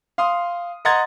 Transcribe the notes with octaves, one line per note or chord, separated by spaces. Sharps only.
F5 C6 D#6
D#5 F#5 A#5 C6 G#6 A6